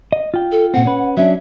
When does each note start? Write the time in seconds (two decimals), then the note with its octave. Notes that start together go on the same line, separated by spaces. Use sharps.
0.12 D#5
0.34 F4 G5
0.52 A4
0.74 A#2 C4 F#5
0.86 C#4 B4
1.17 F#3 C#4 D4 E5